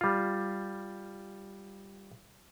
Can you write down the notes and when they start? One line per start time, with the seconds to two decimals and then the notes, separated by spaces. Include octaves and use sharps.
0.01 G3 F4